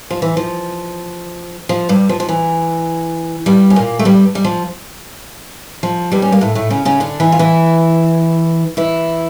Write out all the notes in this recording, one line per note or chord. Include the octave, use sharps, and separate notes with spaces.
F3
E3
F3
F3
G2 G3
F3
F3
E3
G2 G3
C#4
A#2 A#3
A3
G2 G3
G3
F3
F3
G2 G3
C#4
A#3
A2 A3
A2 A3
C#3 C#4
C#3 C#4
D3 D4
E3 E4
F4
E3 E4
E3 E4